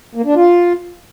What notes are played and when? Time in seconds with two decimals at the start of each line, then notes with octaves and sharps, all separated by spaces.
0.15 A#3
0.25 D4
0.35 F4